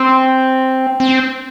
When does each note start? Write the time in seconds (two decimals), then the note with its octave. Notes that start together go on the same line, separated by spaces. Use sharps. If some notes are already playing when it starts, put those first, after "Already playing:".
Already playing: C4
1.00 C4